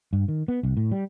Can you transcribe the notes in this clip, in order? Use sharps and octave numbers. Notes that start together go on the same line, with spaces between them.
G2
D#3
B3
C2
A2
G3